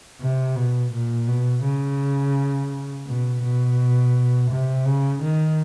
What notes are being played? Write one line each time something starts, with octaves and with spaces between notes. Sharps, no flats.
C3
B2
A#2
B2
C#3
B2
B2
C3
C#3
D#3